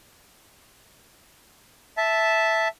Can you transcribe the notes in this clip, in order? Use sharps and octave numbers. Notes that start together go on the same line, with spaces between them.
E5 A5